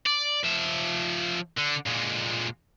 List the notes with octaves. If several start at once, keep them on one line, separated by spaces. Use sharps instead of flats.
D5
F3 E5
D3
A#2 G#3